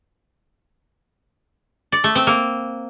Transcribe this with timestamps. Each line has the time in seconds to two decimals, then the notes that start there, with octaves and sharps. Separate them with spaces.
1.92 D5
2.04 A3
2.15 C4
2.27 A#3